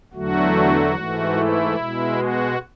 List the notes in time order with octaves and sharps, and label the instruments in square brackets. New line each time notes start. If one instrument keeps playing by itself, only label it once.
[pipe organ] E2 D3 F#3 A3 F#4
G#2 E3 A3
E4
B2 G#3
F#4